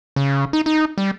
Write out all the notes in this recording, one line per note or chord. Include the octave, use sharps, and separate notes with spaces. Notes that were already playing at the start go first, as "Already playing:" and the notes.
C#3
D#4
D#4
G3